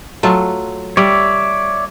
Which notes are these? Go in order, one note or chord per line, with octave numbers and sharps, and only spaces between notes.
F#3 A3 F4
G3 C#5 D5 E5